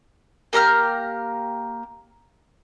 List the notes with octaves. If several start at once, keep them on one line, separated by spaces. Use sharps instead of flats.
A#3 G4 A#5 F6